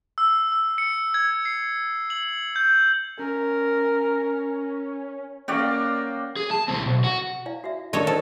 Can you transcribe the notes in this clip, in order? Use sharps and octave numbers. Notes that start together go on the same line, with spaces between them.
E6
E6
C#7
G#6
C7
F#7
G6
C#4 A#4
A#3 C#4 D5 F#5 G5
G#4
A5
C#2 C4
B1
F#4
E4 D5 F5
F#4 D5 E5
D#3 D4 A4 C#5 D#5
G4 A4 C5 D5